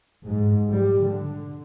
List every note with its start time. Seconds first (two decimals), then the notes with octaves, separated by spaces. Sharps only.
0.24 G#2
0.71 G3
1.04 D3